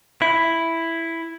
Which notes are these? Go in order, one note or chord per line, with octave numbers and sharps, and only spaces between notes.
E4